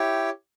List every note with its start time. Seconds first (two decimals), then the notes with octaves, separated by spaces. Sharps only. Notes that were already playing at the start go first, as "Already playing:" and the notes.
Already playing: E4 G4 C#5 G5